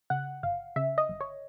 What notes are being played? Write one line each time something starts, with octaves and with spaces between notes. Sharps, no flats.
C#3 F#5
G1 F5
C#3 E5
D#5
G1
C#5